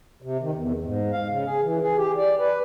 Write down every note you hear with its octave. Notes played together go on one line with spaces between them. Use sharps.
C3
D#3
E2
G#2
F5
C#3
G#4
E3
G#4
G4
D5
B4